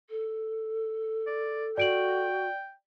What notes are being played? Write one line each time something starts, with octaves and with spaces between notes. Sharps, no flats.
A4
D5
F#4 D5 G5 D7 F#7